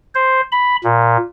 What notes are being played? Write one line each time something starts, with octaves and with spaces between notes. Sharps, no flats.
C5
B5
A#2